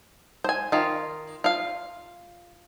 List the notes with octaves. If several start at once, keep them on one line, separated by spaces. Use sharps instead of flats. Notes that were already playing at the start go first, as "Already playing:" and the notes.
C5 G#5
D#3 F4
F4 F5